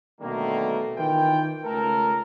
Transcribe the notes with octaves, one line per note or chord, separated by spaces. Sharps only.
B2 D3 D#3 G3 A3 A#3
D#3 E3 F4 G5
C#2 A3 A4 A#4